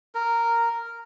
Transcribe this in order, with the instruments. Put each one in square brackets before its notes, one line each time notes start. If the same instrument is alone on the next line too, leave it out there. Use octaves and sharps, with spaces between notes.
[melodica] A#4